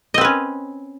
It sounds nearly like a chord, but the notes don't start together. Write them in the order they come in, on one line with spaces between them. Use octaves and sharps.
D#5 C4 B4 C#4